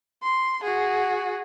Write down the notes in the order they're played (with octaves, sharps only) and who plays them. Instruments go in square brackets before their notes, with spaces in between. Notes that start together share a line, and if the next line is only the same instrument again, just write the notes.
[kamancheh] C6
F#4 G#4